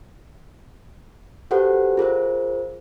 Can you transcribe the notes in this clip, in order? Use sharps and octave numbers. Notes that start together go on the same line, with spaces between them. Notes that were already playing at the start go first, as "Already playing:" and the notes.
F#4 G4 A4 B4 C5 F#5
F4 G#4 A#4 C5